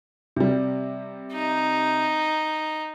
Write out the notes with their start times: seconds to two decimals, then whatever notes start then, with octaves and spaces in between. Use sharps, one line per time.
0.36 C3 G3
1.34 D#4